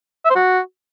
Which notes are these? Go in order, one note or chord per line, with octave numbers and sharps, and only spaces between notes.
E5
C5
F#4